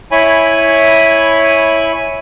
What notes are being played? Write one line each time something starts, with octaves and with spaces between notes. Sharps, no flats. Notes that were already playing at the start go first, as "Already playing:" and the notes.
E4 C#5 G#5 B5